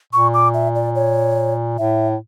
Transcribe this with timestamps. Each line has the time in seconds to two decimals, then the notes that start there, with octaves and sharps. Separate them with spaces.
0.13 A#2 C#6
0.34 D6
0.54 E5
0.75 D5
0.95 C#5
1.78 A2 E5